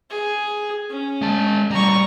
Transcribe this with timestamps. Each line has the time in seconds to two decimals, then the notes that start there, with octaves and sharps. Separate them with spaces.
0.10 G#4
0.90 C#4
1.22 G#3 A5
1.71 A2 G3 A#5 C#6